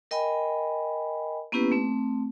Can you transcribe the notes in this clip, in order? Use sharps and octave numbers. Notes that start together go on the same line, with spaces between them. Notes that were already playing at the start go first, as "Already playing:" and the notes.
A#4 D#5 G5 G#5 B5
A#3 B3 C#4 E4 G4 B4
A3 C4